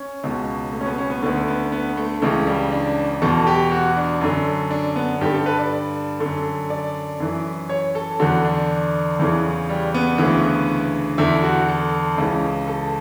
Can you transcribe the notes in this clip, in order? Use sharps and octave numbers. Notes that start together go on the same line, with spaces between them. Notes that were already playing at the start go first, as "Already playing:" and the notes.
Already playing: C#4
C#2 B2
A3
C#4
B3
C#4
B3
D2 D3 B3
B3
B3
A3
C#2 C#3 E3 A3
G3
D4
E2 B2 A4
G4
F#4
D4
F#2 D3
D4
B3
G2 D3 G4
A4
B4
D5
D3
F#2
D5
F#2 E3
C#5
A4
E2 D3 F#4
D4
E2 C#3 E3
G3
B3
D2 C#3 E3
E2 D3 E4
F#4
A4
C#2 C#3 E3
A4